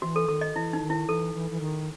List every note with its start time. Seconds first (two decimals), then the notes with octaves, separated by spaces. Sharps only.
0.02 E3 F#4
0.16 A4
0.28 D#3 A4
0.41 D#5
0.55 E3 E4
0.73 D#4
0.82 D#3
0.90 E4
1.08 E3 A4
1.35 E3
1.51 E3
1.60 D#3